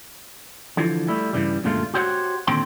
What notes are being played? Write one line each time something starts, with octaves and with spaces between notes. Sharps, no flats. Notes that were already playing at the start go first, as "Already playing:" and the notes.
D3 E3 F3
G3 A3 E4
G2 A#2 C#3 E3 G3
F#2 A#2 D3 G#3 A3 F4
F#4 G4 C5 C#5 D#5 F#5
A#2 D3 D#3 C4 G5 C6